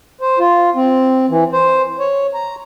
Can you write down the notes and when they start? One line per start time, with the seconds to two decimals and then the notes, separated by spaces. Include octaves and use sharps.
0.21 C5
0.39 F4
0.75 C4
1.30 E3
1.53 C5
1.99 C#5
2.34 A#5